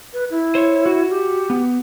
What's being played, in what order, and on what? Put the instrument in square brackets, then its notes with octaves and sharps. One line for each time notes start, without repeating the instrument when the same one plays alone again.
[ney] B4
E4
[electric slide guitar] C5 C#5
F#4
[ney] G4
[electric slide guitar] B3